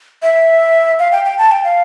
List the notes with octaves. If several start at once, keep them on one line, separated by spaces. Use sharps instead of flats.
E5
F5
G5
G5
A5
G5
F5